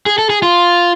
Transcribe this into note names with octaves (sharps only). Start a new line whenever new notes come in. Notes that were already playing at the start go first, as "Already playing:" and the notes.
G#4
A4
G#4
F4